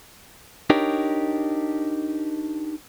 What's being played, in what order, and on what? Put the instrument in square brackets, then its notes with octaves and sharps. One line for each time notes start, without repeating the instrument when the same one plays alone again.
[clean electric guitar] D4 D#4 G4 A#4 C#5